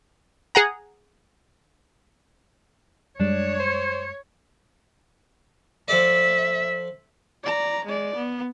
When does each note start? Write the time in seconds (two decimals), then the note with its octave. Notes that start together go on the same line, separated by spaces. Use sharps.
0.55 G#4 F#5 A#5
3.19 F#2 G3 G#3 D4 C#5
3.59 C5
5.88 F3 A4 D5 E5
7.44 D5 A#5
7.85 G#3 D5
8.16 B3